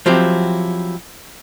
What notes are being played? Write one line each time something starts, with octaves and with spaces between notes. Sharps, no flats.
F3 F#3 C4 E4 G4